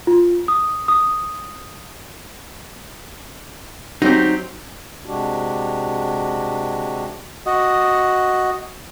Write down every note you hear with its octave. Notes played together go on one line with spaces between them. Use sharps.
F4
D#6
D#6
F#3 C4 D#4 G4
C3 G#3 D4 F#4 G4
F#4 D#5